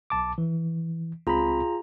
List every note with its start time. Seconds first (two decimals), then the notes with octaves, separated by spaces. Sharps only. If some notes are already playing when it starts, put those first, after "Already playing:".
0.10 B1 A5 D6
0.38 E3
1.27 C#2 C4 F4 G#4 A#5 B5